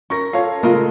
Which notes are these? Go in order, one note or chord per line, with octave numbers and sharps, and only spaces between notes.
C#4 A#4 C#6 A#6
F4 A4 C#5 F5
C#3 G#3 A3 F4 A#4